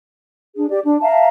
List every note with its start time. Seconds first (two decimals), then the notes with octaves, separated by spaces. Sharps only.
0.56 D4 G#4
0.70 G4 D5
0.84 D4
1.02 E5 F5 A5 A#5